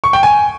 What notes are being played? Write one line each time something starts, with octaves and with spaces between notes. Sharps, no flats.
C#6
G5
G#5